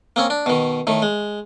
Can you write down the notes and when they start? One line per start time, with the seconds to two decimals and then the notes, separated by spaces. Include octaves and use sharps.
0.16 A#3 C4 C#4
0.30 D4
0.46 B2 D#3
0.87 A2 D#3
1.02 G#3